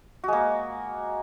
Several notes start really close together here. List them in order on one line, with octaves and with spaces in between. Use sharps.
F#4 G#3 A#3